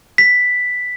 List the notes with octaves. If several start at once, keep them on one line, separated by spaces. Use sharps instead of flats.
B6